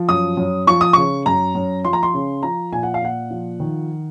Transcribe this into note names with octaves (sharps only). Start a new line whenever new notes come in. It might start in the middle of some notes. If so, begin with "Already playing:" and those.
Already playing: F3
F#2 D#6
F#2
F3 C#6
D#6
C#3 C#6
F#2 A#5
F#2
F3 C6
A#5
C6
C#3
F3 A#5
A#2 G#5
F#5
F5
A#2 F#5
F3
D#3